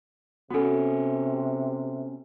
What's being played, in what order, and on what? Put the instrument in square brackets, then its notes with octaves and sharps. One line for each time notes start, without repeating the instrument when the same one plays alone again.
[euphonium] C3 [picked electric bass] B3 C#4 [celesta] F#4 A4